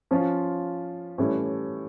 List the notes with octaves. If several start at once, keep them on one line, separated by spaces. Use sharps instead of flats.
F3 C#4 F4
A2 E3 G3 C#4